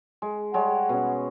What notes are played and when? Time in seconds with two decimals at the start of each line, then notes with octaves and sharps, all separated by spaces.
0.22 G#3
0.54 G3 G#3 C#5 F#5
0.89 B2 C#4